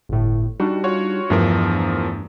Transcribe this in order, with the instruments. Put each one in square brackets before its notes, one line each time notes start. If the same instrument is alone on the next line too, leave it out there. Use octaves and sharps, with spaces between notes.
[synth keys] G1 A2
[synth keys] G3 D4 D#4 [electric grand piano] F#4
[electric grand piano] F4 F#4 C#5
[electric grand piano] E2 F3 A#4 [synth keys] G2 A3 D4